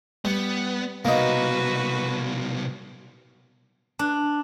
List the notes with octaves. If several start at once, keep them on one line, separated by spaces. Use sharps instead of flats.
G3 B3
C2 B2 A#3 D#4 F#4 B4
D4